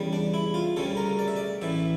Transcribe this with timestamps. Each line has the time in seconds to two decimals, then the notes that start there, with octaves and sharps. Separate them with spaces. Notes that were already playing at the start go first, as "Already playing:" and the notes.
Already playing: E2 C#3 G3
0.13 D4
0.34 E4
0.54 F4
0.76 D2 C#3 G3 C#4 A4
0.97 A#4
1.19 D5
1.28 E5
1.36 D5
1.61 A1 A2 E3 E5